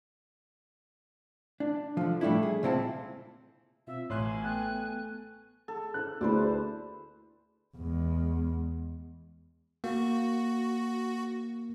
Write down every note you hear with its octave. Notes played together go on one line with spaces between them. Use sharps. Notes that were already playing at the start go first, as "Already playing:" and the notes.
D4
D3 F3
A2 G3 A3 D4 E4
G#4
C#2 A#2 C4 E4 F#5 A5
B2 C4 F4 E5
A1 A2 G#5 C6 F#6
A3 B3 G5 F#6
A4
F#6
D2 E4 G#4 B4 C5 D5
E2 G#3
A#3 F#4